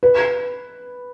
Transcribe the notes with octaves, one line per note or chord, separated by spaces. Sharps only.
B4